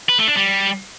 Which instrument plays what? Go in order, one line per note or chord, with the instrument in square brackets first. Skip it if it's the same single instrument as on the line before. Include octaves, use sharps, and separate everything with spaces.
[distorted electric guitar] B4
A3
D4
G3